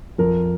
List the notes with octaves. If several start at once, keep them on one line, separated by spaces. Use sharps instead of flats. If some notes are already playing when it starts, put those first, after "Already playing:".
F2 A#4